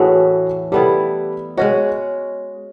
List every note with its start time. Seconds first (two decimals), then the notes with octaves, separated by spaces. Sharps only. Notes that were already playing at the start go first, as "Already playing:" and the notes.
Already playing: A2 E3 A3 F#4 G#4
0.72 G3 B3 E4 G4 A4
1.57 G#3 C#4 F#4 C#5 D#5